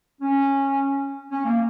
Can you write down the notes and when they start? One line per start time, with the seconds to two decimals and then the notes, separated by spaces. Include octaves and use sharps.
0.21 C#4
1.31 C#4
1.45 A#3